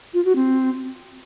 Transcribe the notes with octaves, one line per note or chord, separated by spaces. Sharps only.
F4
F#4
C4